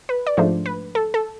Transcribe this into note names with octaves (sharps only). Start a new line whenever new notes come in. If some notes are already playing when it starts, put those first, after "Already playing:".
B4
D5
G#2 F3 A3 D4 C5
B4
A4
A4